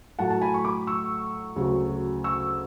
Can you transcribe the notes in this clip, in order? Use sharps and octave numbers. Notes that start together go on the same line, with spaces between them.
A2 F#3 A3 F#5 A5
A5
G#5 B5
C#6
B5 D6
C#6 E6
D2 C#3 F#3 A3
C#6 E6